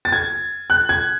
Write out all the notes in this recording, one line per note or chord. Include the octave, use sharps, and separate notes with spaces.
A6
G#6
F#6
G#6